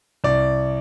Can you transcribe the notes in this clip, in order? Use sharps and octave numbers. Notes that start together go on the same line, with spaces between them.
C2 D5